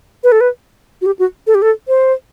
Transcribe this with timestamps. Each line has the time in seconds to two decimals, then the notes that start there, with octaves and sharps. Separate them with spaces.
0.24 B4
0.32 A4
0.41 B4
1.02 F#4
1.06 G4
1.19 F#4
1.47 A4
1.55 G4
1.62 A4
1.88 C5